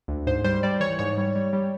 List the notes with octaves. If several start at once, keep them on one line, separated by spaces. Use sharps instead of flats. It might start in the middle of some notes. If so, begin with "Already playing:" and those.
D2
G#2 C5
G3 C5
G3 D5
E3 C#5
G#2 C#5
G3
G3
G3